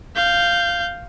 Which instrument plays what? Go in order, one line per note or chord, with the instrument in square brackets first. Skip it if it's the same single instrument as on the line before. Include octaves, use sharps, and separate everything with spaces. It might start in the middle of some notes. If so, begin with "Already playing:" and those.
[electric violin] F5 G6